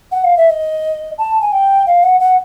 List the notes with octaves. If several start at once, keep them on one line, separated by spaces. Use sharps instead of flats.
F#5
F5
E5
D#5
A5
G#5
G5
F5
F#5
F#5